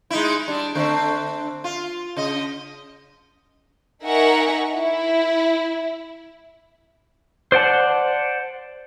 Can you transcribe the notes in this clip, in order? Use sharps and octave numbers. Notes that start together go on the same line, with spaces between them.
G#3 D#4 E4
G3 D4
D3 A3 C4
F4
C#3 D#5
D#4 A#4 E5 F#5 G#5 C#6
E4
C5 D5 F#5 A5